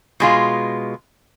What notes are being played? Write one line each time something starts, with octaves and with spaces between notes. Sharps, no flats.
B2 G#3 F4